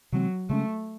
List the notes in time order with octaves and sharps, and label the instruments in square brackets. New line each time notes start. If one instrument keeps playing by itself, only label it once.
[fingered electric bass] C3 E3 G#3 C4 [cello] F#3
[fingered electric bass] C#3 G#3 C#4 [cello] A3